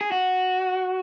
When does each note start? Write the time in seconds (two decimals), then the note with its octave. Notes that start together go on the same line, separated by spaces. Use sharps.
0.01 G#4
0.12 F#4